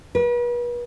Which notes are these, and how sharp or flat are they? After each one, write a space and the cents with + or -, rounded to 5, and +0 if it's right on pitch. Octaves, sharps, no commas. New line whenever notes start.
B4 -40